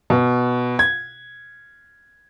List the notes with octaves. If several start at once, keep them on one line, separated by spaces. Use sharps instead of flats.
B2
G#6